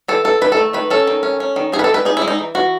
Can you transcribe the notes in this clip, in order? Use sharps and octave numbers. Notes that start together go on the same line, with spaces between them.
E3 A4
E3 A4
D#3 B4
A4
A3
D#3 B4
C#4 A4
D#3
C#4
C#4
D#3
D#4 G#4
B4
A4
G#3
B4
D#4 G#4
E4
G#3
D#4
E3
E3 F#4